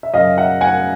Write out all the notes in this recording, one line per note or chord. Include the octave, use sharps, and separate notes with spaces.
E5
F#2 C#3 F#3 D#5 F5
E5 F#5
F#5 G#5